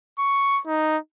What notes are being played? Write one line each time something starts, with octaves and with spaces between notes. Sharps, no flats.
C#6
D#4